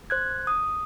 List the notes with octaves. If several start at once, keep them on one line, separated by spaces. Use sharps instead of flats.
C5 F#6 G#6
D#6